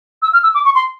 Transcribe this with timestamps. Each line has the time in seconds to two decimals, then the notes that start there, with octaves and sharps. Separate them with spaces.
0.22 E6
0.33 F6
0.43 E6
0.55 D6
0.65 C#6
0.75 C6